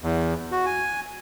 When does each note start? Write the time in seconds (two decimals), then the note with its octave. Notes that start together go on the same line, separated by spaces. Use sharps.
0.03 E2
0.52 F#4
0.66 G#5